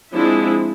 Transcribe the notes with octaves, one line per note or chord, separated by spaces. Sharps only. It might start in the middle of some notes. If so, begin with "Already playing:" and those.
F3 G#3 C4 D4 E4